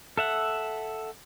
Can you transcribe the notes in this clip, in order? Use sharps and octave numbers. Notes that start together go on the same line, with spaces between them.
A4 E5 F#5